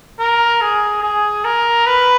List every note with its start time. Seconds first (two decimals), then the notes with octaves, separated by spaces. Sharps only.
0.20 A#4
0.61 G#4
1.03 G#4
1.45 A#4
1.87 B4